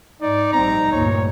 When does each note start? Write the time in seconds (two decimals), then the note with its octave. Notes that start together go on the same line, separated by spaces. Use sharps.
0.21 G#2 D#4 D5
0.53 A#1 G3 C4 A#5
0.92 D2 G2 A#2 C#5